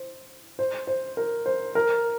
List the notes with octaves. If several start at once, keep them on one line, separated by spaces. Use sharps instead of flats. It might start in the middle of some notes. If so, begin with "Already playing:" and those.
Already playing: C5
C5
C5
A#4
C5
A#4